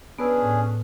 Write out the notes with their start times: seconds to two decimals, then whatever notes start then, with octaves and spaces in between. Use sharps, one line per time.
0.19 B3 C#4 D4 G#4 B4 E6
0.42 A2